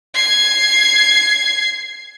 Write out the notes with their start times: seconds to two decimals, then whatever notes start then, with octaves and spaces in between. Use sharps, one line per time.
0.16 G#6 C7